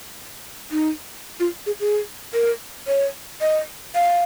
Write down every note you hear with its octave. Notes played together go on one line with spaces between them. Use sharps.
D#4
F4
G#4
G#4
A#4
C#5
D#5
F5